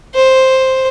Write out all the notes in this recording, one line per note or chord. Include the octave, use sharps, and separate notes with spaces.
C5